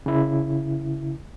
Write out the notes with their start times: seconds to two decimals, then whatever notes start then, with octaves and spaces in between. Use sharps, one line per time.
0.06 C#3 E4